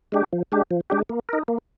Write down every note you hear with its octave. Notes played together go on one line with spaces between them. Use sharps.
G#3 D4 G4
F3
G#3 D4 G4
F3
G#3 D4 G4
A#3
D#4 A#4
A#3